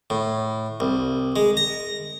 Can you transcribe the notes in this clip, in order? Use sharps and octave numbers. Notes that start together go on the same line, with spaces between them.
A2
C2
G#3
A#5